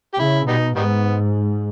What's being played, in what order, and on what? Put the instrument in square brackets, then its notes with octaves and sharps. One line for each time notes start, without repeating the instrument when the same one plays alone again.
[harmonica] G4
[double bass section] C#3 [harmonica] E4
[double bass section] B2 [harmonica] G3 B3 D#4
[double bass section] G#2 [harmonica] D#3 G3 B3